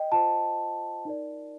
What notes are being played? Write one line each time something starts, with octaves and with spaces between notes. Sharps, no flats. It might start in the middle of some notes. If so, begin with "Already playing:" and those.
Already playing: D#5 G5
F4 C5 A5
D#4 A#4 D5